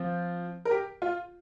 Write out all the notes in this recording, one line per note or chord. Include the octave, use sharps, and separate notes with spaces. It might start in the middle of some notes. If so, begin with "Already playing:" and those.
Already playing: F3 C4 F4
A#4
G4
F4